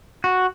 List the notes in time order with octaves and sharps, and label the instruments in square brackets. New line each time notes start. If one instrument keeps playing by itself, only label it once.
[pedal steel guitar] F#4